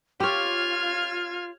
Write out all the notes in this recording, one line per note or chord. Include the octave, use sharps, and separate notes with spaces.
F4 G4 C#5 F6 G#6